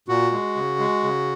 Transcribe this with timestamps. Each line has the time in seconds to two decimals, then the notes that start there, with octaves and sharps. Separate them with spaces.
0.08 A#2 F#4
0.32 G#3
0.56 C#3
0.79 G#3
1.04 C#3